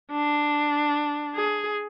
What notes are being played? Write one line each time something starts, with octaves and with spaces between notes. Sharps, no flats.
D4
G#4